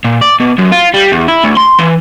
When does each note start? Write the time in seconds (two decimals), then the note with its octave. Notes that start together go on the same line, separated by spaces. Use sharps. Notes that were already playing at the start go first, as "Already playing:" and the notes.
0.04 A#2
0.21 D5
0.40 B2
0.58 F#2
0.72 F4
0.94 G3
1.12 E2
1.28 E4
1.44 D2
1.57 C6
1.79 E3